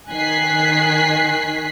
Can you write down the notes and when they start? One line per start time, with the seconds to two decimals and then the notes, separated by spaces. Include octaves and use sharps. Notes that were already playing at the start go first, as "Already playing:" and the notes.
0.10 D#3 G#5 F#6 B6 C7